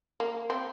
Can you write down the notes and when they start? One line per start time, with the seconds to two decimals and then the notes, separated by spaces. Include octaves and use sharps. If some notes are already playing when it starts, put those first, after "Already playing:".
0.20 A#3
0.50 C4